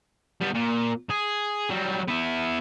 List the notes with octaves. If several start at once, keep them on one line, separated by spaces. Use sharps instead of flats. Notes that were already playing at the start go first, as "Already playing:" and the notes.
G3 B3
A#2
G#4
F#3 G3
B3 E4